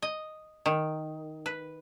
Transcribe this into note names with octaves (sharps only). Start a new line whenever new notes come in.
D#5
D#3
B4